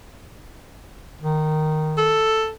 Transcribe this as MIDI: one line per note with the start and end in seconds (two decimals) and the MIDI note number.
1.21 2.26 51
1.98 2.51 69